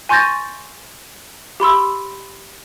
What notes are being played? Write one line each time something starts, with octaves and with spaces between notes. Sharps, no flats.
G#5 C6 C#6 G6 A6 A#6
G4 B5 C6 E6